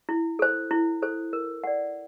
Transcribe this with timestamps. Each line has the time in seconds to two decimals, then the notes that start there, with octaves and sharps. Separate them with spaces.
0.09 E4
0.39 A4 C5
0.71 E4
1.02 A4 C5
1.33 A#4
1.64 D5 F#5